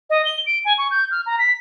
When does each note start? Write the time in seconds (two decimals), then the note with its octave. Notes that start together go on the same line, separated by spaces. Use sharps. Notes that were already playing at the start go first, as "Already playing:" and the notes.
0.10 D#5
0.25 G7
0.46 D7
0.65 G#5
0.78 C#6
0.91 G6
1.11 F6
1.26 A#5
1.39 B6